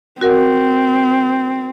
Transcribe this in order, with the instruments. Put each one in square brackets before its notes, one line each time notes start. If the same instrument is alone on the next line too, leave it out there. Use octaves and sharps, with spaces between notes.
[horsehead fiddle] C4 [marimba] F#4 A#4 F#5